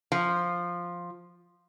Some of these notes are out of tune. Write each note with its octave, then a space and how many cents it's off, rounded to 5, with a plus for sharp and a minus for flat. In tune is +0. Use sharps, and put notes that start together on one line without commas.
F3 +0